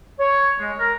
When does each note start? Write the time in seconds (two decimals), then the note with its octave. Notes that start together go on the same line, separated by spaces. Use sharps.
0.20 C#5
0.60 G#3
0.79 A#4